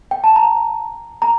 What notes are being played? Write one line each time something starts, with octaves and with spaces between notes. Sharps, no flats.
G5
A5
A#5
A#5